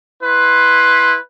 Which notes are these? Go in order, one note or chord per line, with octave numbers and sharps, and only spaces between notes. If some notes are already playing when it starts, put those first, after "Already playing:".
E4 B4 C6